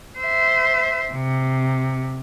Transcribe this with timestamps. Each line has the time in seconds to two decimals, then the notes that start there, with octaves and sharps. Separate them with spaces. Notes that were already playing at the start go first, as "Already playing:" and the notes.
0.19 C5 E5
1.13 C3